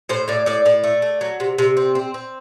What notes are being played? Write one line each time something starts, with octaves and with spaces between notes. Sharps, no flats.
A2 C5
A2 D5
A2 D5
A2 D5
A3
A3
F#3
C3
C3
C4
C4
C4